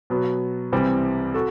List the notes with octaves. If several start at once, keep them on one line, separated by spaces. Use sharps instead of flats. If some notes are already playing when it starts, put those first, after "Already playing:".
B2 F#3 B3
C2 C3 E3 G3 C4
F#4 A4